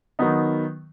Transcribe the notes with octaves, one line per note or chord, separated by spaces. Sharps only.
D#3 F#3 B3 D#4